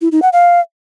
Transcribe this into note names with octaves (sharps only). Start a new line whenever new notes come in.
E4
D#4
F#5
F5